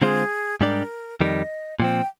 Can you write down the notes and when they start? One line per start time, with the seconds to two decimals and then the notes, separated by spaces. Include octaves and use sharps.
0.02 D3 G#3 C4 F4 G#4 C5
0.61 G#2 G3 D4 G4 A#4 D5
1.21 F2 D#3 G3 D#5
1.80 A#2 F3 C4 G5